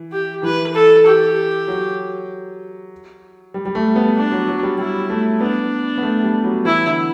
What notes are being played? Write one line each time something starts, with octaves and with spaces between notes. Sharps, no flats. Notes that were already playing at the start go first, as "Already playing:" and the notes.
Already playing: E3
G4
E3 B4
A4
G4
F#3
G3
G3
A3
B3
D4
F#3
F#3
G3
G3 E4
A3
B3 D4
B3
A3
G3
F#3
E3 E4
D3